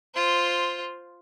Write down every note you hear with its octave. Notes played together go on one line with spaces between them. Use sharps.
F4 C5